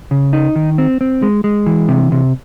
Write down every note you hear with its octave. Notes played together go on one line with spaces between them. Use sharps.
C#3
D#4
D#3
C4
C4
G#3
G#3
E3
C3
C3